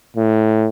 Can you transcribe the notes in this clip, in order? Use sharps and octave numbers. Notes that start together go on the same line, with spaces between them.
A2